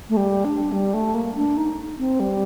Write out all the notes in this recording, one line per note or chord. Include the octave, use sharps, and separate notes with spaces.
A3
G3
D4
G3
A3
A#3
D4
D#4
C4
G3